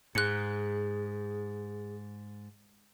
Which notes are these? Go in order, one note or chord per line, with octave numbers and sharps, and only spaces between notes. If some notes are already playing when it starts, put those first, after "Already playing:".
G#2 G#4 F#6 C#7